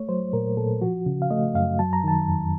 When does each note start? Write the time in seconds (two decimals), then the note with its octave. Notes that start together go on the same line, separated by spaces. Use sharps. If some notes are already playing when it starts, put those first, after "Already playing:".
Already playing: A3 C#5
0.09 F#3 C5
0.33 A#2 A#4
0.57 A#2 A4
0.81 F3 F#4
1.06 C#3
1.22 F5
1.31 A3 D#5
1.55 F#2 F5
1.79 F#3 A5
1.93 A#5
2.04 D#3 A5
2.28 F2